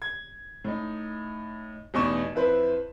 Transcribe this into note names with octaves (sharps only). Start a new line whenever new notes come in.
G#6
A2 D#4
A1 E2 B2 D#4 C#6 E7
F2 E4 B4 C5